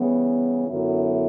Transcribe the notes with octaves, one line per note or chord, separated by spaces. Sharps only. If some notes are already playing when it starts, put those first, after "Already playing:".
Already playing: C#3 E3 G3 B3
F#2 D3 F#3 B3 E4